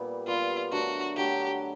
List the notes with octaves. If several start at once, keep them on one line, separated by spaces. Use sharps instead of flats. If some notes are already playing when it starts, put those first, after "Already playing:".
Already playing: A#2 G3 B3
A#2 G3 B3 F4
D3 F#3 A3 F#4
D3 F#3 A3 G4